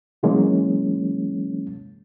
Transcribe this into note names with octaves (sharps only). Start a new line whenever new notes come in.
C3 E3 F#3 G#3 A#3 C#4